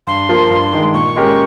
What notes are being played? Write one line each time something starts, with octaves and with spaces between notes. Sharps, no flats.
G2 C6
F3 A#3 F4
G2
D#3 G#3
A#2 C#6
G#3 C#4 G4 A#4